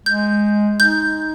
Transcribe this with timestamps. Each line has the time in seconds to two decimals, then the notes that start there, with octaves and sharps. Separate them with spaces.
0.06 G#3 G6
0.79 D#4 G6